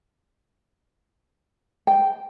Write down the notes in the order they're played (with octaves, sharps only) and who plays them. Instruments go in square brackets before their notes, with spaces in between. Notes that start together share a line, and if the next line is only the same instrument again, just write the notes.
[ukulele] G5